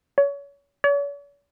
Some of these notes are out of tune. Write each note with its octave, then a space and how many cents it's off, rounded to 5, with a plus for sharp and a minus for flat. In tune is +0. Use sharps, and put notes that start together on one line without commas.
C#5 +30
C#5 +45